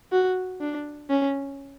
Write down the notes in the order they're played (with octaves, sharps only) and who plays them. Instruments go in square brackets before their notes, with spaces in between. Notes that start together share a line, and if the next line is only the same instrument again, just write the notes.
[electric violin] F#4
D4
C#4